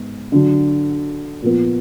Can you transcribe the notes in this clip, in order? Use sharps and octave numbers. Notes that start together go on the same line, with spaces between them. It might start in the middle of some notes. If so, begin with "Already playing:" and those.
Already playing: G#2 B3
D3 F#3 D4
A#2 F3 B3